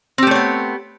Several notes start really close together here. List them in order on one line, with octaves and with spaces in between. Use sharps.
C4 G4 A3 C#5 B3